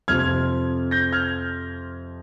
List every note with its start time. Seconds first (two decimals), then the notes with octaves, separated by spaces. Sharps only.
0.08 F2 C3 F3 C4 F6 G#6
0.91 G6 A#6
1.13 F6 G#6